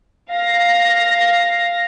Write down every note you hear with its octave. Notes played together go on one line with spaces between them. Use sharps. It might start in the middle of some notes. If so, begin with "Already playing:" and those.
F5 A#6